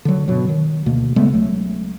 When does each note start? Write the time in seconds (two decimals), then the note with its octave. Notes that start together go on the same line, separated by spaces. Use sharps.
0.05 D3 F#3
0.28 G2 B2 F#3
0.49 D#3
0.86 D2 B2 A#3
1.16 C#3 G#3 A3 B3
1.33 C#2 F#3 A3